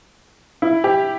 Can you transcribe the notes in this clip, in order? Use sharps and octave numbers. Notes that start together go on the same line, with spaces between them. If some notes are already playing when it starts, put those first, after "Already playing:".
E4
G4